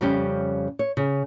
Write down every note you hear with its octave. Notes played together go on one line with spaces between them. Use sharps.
F2 C#3 G3 C#4 G4
C#5
C#3